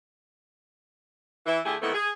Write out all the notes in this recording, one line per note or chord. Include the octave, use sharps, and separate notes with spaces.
E3 E5
D3 A3 E4 G4 G#4
D#3 E3 A3 B3 C4 E4
G#4